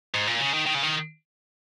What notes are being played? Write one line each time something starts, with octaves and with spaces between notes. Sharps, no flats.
G#2
A#2
C#3
D#3
D#3
C#3
D#3